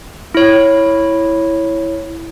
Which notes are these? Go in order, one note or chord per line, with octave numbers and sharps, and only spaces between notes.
E4 C#5